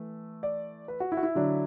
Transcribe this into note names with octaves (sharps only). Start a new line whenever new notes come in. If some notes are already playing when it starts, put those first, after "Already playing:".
Already playing: E3 A3
D5
B4
F#4
E4
F#4
E4
D3 F#3 D4